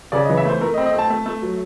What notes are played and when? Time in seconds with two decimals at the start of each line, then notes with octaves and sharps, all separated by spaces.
0.12 C#3 D5
0.25 D#5
0.29 E3
0.37 E5
0.45 A3 C5
0.61 A3 A#4
0.74 D#5
0.78 C4
0.86 D#5
0.94 A3 A5
1.10 A3
1.26 A3
1.42 F#3